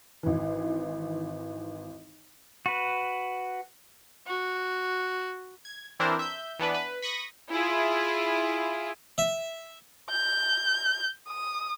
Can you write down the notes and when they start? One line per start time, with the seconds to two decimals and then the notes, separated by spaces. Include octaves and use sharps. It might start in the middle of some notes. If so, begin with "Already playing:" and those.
0.23 G#1 E3
2.66 F#4 B4
4.27 F#4
5.65 G#6
6.00 E3 C4 D4 E4 A#4 C5
6.19 E5 G6
6.59 E3 B3 D4 B4
6.74 B4
7.02 B5 C#6 D#6 A#6
7.50 E4 F4 G#4
9.18 E5
10.10 G6
11.29 D#6